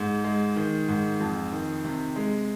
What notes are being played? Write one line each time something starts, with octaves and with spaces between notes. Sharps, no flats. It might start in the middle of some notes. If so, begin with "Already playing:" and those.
Already playing: G#2
G#3
D#3
G#2
F2
D#3
C3
G#3